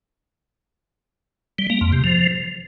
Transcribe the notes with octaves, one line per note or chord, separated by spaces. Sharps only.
G3
A#3
F2
C3
F3